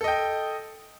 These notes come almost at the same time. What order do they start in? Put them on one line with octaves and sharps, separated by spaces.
A4 D#5 G5